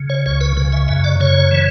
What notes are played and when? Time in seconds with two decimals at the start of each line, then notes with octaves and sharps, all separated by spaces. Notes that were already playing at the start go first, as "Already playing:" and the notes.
Already playing: C#3
0.10 C#5
0.26 C#2 C#5
0.41 B4
0.57 C#3 B4
0.72 E5
0.88 F#2 E5
1.04 D5
1.20 C#3 C#5
1.51 E3